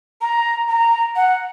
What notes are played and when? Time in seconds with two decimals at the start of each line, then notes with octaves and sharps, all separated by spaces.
0.21 A#5
0.69 A#5
1.16 F#5